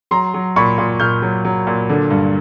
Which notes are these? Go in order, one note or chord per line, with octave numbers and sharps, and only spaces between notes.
F#3 A#5 C6
F#3
A#2 B5 C#6
A#2
A#2 F6 G6
F#3
F#3
A#2
D3
G2